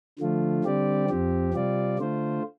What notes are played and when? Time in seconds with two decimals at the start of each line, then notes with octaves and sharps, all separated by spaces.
0.19 D3 F3 A3 F4
0.65 D3 G3 C4 G4 D5
1.09 F2 F3 C4 G4
1.54 C3 G3 C4 F4 D5
1.99 D3 A3 F4 C5